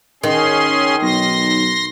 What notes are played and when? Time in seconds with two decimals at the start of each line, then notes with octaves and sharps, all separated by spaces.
0.23 D#3 C#4 G#4 C6
1.02 B1 C6 A#6